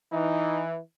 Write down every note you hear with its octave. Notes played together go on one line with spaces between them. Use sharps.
E3 D#4